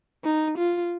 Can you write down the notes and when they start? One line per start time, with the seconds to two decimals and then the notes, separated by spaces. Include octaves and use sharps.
0.24 D#4
0.58 F4